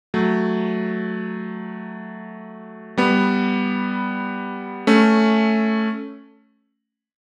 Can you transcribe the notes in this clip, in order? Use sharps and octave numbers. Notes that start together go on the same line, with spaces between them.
F#3 A3
G3 B3
A3 C#4